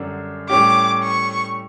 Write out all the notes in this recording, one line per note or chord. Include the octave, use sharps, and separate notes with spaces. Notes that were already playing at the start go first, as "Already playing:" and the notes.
Already playing: F#2 D3 G3 D4
A2 G3 C#4 G4 D6
C#6